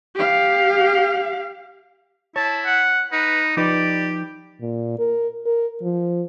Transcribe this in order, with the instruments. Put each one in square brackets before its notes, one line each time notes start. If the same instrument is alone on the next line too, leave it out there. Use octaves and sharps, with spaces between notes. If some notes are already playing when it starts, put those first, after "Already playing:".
[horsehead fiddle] G4 F5
[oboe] E4 [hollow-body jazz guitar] C#5 [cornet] A5
[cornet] F#5
[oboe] D#4 [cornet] B4
[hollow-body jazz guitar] F3 D#4 B4 [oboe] G4 [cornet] D5
[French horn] A#2
A#4
A#4
F3